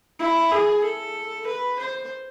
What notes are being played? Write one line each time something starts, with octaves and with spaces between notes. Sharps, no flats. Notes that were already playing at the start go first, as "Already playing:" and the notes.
E4
G#4
A4
B4
C5